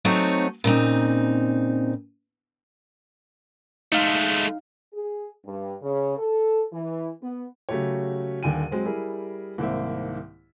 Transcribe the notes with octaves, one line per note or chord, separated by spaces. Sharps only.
F#3 A3 C4 D#4 F#4 C#5
A#2 C#3 C4 D#4
G#3 A3 D#4 F5
G#4
G2
C#3
A4
E3
B3
C#3 F#3 A3 F#4 G4 C#5
D#1 D#2 D3 G5 G#5 D#7
F#3 G#3 C4
G3 E4 G#4 A#4
C2 G#2 D#3 A#3 C4 E5